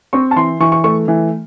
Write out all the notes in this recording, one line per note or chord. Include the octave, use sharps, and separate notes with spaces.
C4 C#6
A5
E3 C6
E3 C#6
C#6
A3 C#6
E3